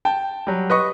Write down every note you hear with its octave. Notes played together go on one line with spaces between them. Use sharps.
G5 A5
F#3 G3
B4 D#5 C#6